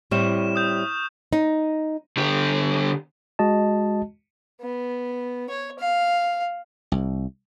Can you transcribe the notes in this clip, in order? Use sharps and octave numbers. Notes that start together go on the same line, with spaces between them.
A2 G3 C4 C#6 F6 E7
D#6 G6
D#4
D3 G4
G#3 F#4 D#5 A5
B3
C#5
F5
C2